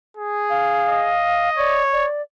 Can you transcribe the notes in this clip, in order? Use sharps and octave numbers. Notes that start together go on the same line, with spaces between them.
G#4
F5
D#5
C#5 D5
D5